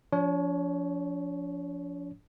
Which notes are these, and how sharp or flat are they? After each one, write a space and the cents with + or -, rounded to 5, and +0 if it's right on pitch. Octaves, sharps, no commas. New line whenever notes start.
F3 +0 D4 -40 C#5 +0